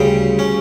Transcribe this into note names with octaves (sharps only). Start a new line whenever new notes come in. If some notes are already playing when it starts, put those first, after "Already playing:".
Already playing: D2 C#3 G3
C#4